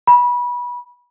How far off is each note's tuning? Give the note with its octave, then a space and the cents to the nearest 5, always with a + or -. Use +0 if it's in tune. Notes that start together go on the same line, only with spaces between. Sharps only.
B5 -25